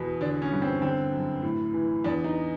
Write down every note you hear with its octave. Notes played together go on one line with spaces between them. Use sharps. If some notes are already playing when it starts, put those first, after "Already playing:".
Already playing: E2 B2
D3 D4
C#4
G2
C4
D3 C4
F#2
A2
E3
E2 D4
D#4